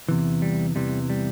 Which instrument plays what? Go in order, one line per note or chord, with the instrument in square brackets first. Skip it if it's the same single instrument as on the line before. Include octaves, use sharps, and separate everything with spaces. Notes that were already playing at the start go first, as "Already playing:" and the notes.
[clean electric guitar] E2 C3 E3
G3
E2 C3 E3 G3
G3